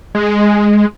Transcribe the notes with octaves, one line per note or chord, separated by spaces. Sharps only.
G#3